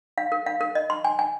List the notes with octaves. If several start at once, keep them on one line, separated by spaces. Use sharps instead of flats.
F5
A#4
F5
A#4
D#5
C6
G#5
G#5